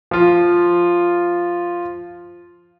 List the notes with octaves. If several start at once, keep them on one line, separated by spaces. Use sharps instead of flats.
F3 F4